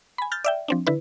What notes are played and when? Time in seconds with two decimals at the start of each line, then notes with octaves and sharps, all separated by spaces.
0.18 G#5 B5
0.32 F6 G6 A6
0.44 D5 E5 G5
0.68 F3 C4 D4
0.87 D3 E4 B4